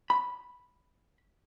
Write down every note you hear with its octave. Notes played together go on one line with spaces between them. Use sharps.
B5